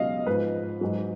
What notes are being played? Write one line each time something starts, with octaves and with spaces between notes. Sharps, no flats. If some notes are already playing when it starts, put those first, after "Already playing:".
Already playing: C#2 B2 F#3 D#5 F5
G#2 F3 B4
G#2 F#3